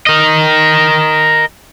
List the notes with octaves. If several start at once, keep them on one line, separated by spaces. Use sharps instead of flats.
A#4 D#5